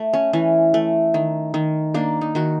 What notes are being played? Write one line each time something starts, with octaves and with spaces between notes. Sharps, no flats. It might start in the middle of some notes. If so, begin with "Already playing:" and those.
Already playing: A3
C#4
E3 C#4
A3
D#3
D#3
A#3 D4
D#4
D#3 F#4